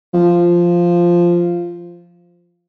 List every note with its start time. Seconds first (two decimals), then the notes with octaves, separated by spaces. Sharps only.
0.14 F3